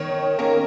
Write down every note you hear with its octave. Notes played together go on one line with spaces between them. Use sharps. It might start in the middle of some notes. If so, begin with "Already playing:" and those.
Already playing: D#3 C#5
A#3 C#4 A#4